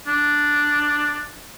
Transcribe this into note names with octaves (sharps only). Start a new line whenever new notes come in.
D4